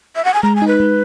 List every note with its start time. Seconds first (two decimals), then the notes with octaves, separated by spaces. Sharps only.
0.16 E5
0.25 F#5
0.34 G#5
0.43 G#3 A#5
0.55 G#5
0.62 D#4
0.67 B4
0.80 G#3